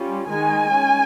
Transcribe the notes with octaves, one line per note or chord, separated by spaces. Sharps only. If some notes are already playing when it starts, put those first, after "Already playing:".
Already playing: G3 C#4 F4
D#3 G#3 D#4 G#5
G#3 C#4